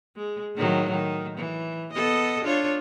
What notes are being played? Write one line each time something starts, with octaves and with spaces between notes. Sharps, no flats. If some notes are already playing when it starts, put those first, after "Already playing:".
G#3
A2 D#3 F#3
D#3
E3
B3 A4 D#5
D4 F4 C#5